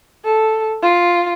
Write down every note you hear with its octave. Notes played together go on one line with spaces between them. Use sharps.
A4
F4